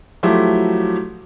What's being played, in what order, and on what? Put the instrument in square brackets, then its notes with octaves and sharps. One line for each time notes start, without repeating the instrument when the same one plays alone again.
[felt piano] F3 F#3 A3 E4 G4